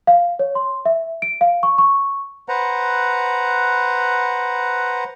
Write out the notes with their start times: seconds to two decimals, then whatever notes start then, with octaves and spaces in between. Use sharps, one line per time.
0.07 F5
0.39 C#5
0.55 C6
0.86 E5
1.22 D7
1.41 F5
1.63 C#6
1.78 C#6
2.49 B4 C5 F#5 A#5